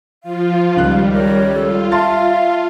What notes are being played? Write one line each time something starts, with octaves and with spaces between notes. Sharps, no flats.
F3 F4 F5
C#2 D#3 G3 F#6
A#4 C#5
F4 A4
E5 F5 A5 C6 A6